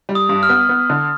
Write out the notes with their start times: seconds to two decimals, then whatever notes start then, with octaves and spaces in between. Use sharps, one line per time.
0.09 G3
0.15 D#6
0.29 G2
0.43 F6
0.49 B3
0.69 B3
0.90 D3